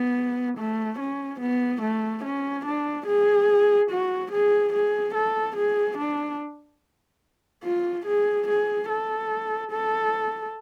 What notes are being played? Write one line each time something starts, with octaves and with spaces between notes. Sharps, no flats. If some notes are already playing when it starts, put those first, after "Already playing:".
Already playing: B3
A3
C#4
B3
A3
C#4
D4
G#4
F#4
G#4
G#4
A4
G#4
D4
F4
G#4
G#4
A4
A4